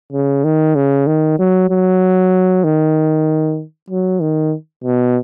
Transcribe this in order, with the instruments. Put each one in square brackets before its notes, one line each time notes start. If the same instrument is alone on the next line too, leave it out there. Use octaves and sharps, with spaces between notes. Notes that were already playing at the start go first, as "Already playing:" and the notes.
[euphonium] C#3
D#3
C#3
D#3
F#3
F#3
D#3
F#3
D#3
B2